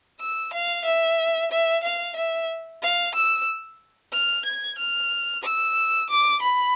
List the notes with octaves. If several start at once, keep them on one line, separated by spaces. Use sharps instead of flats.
E6
F5
E5
E5
F5
E5
F5
E6
F6
G#6
F6
E6
D6
B5